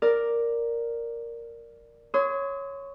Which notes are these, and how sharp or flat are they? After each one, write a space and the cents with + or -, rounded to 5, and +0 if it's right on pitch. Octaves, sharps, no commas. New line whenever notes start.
A#4 +0 D5 +0
C#5 +0 C6 -30 D#6 +40